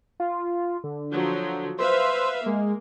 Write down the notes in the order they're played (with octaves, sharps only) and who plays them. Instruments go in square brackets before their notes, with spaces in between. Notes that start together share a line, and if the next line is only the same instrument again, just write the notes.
[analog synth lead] F4
D3
[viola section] F3 F#3
[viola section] B4 E5 F5 [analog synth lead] C5
[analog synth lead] G#3 [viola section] A#3